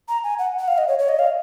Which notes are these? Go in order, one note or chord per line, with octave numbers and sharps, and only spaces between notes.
A#5
G#5
F#5
F#5
F5
D#5
C#5
C#5
D#5
F5